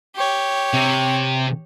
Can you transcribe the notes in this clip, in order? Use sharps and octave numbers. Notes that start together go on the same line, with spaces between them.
G4 C#5
C3